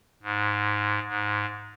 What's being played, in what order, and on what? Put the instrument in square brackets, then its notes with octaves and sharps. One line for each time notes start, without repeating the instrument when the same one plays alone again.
[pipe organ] G#2
G#2